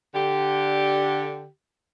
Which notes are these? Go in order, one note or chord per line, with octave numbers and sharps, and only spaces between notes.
D3 G4